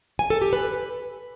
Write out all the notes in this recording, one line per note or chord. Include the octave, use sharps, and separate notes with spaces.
G#5
A4
G4
B4